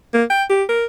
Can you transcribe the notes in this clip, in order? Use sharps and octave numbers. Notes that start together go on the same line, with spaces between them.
A#3
G5
G4
A#4